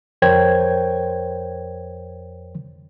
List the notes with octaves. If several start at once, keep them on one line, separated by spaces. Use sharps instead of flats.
F2 A#4 C5 C#5 G5 G#6